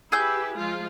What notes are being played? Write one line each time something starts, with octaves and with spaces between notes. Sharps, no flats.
E4 G4 G#4 B4 E6 G6
F3 G#3 F4